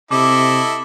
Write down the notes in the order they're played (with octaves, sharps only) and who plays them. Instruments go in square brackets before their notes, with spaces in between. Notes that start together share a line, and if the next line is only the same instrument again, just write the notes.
[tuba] C3 [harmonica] E4 A4 D#5 [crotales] D6